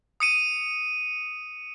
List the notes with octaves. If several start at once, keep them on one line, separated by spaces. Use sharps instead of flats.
D#6 C#7 D#7